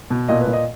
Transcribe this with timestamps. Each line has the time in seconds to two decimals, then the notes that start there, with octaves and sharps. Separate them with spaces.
0.10 B2
0.28 A#2 D#5
0.41 B4
0.48 A#2
0.53 D#5